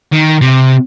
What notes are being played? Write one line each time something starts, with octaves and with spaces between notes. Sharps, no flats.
D#3
C3